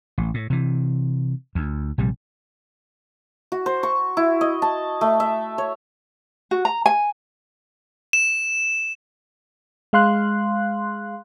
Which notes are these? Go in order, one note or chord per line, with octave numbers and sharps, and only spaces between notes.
A1
A2
C3 E3
D2
A#1 C3 G3
F#4
C5
C#6
E4
D#5
A5
A3
E5
C#5
F#4
A#5
G#5
E7
G#3 F5 C6 F#6